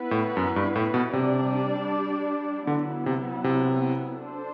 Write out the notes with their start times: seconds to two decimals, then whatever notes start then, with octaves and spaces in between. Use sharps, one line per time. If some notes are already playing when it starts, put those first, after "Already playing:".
Already playing: B3 E4 B4
0.11 A2
0.37 F#2
0.56 G2
0.76 A2
0.94 B2
1.13 C3 G3 D4 G4 D5
2.67 D3 F#3 B3 E4
3.06 C3
3.44 C3
4.21 D4 A4 C5